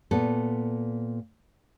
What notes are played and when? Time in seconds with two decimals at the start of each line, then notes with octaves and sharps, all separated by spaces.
0.11 A#2 B3 A4